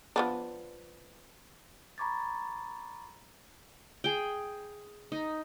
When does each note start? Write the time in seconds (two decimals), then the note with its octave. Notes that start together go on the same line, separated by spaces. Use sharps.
0.16 F3 B3 D4
1.98 A#5 B5 C#6 D6 G#6 A6
4.04 G#4 G5
5.12 D#4